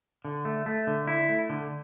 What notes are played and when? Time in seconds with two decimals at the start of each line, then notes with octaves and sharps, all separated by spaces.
0.25 D3
0.45 A3
0.66 A3
0.87 D3
1.07 E4
1.29 A3
1.50 D3